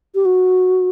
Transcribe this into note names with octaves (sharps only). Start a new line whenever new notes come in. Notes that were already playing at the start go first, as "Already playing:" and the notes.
G4
F#4